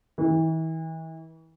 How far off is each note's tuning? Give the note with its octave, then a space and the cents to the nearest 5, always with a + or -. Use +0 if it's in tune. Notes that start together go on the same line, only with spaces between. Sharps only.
E3 -40